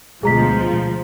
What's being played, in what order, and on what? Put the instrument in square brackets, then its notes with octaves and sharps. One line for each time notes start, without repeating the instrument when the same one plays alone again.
[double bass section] D2 B2 G#3 [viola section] F3 [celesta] G#4 A#5 B6